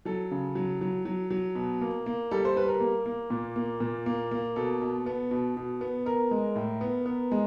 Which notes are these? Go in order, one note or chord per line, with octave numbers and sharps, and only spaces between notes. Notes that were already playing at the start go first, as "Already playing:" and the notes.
F#3 A4
C#3
F#3
F#3
F#3
F#3
B2
A#3
A#3
G3 A4
C5
G3 B4
A#4
A#3
A#3
A#2
A#3
A#2
A#3
A#3
B2 A4
B2
B3
B2
B2
B3
B3 A#4
G#3
A2
B3
B3
G#3